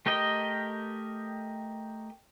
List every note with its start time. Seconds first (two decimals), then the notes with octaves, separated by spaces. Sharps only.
0.06 A3 G4 A#4 D#5 G5